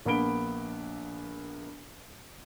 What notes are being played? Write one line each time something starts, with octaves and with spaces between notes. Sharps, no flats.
A#1 A#3 B3 B5 D7 G7